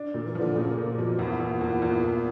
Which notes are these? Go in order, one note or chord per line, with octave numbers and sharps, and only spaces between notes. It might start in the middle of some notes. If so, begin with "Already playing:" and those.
Already playing: D4
A#2
E3
F3
D3
A#2 C#3
A#3
B2 F3
E2 A#2
E2
E2
E2
E2